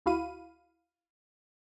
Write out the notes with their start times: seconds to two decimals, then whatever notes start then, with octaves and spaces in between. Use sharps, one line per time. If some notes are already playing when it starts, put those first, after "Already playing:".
0.06 D2 E4 F#4 F5 B5 D#7